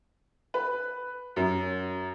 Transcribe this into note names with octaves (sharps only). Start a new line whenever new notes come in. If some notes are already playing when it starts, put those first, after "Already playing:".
B4
F#2